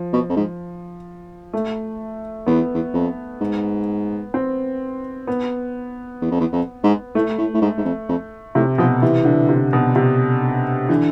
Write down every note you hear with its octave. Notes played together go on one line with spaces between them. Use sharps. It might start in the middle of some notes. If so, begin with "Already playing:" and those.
Already playing: F3
B2
F2
G#2
A3
E2 B3
E2
F2
G#2
C4
B3
E2
F2
E2
F2
G#2
A2 A3
A2
A2
G#2
G#2
F2
F2
A2 C3
B2 F3
C3 E3
D3
C3
B2
C3
D3 E3